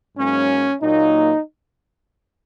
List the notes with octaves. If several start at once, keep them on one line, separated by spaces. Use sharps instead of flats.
G#2 F#3 A#3 C#4
A#2 F#3 A#3 D#4